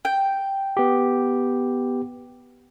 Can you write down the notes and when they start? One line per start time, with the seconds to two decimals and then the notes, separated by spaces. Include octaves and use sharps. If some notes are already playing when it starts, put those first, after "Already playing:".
0.05 G5
0.77 B3 G4